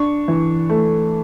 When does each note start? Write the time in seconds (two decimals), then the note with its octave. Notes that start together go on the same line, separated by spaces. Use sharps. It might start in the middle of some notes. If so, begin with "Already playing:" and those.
Already playing: D4 C#6
0.28 E3
0.69 A3